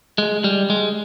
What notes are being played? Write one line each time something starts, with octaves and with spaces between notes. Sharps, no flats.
G#3
G3
G#3